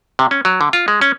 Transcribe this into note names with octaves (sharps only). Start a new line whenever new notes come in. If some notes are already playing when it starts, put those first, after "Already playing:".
C3
C#4
F#3
D3
F4
G#3
C#4